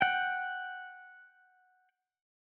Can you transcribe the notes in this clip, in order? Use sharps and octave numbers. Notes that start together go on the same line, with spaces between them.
F#5 G5